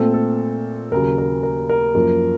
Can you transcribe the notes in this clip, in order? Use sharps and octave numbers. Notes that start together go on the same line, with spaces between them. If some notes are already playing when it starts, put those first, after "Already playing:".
Already playing: A#2 A3 C4 A4
A4
D#2 C#3 F#3 A#4
A#4
A#4
A#4
F#2 F3 A#3